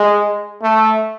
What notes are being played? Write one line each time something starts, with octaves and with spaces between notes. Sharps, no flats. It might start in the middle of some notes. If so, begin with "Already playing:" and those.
Already playing: G#3
A3